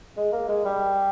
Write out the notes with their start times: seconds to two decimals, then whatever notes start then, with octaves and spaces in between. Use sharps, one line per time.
0.17 G#3
0.32 A#3
0.49 G#3
0.65 G3